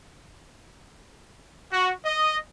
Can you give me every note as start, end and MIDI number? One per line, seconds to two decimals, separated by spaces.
1.72 1.93 66
2.05 2.38 75